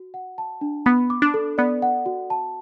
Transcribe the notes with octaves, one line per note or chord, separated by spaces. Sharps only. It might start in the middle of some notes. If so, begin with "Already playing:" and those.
Already playing: F#4
F#5
A5
D4
B3 B5
D6
D4
A4
B3 D5
F#5
F#4
A5